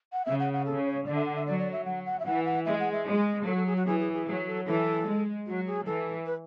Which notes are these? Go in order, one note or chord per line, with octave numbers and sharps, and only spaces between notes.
F#5
C#3 E5
F#5
F#5
C#3 A4
C#5
D3 D5
E5
F#5
E5
F#3 D5
D5
E5
F#3 F#5
F#5
E5
E3 F#5
F#5
G#3 E5
F#5
E5
G#3
F#3 A4
A4
G#4
F#4
E3 G#4
G#4
G#4
F#3 G#4
A4
E3 A4
G#3
F#3 F#4
G#4
E3 A4
B4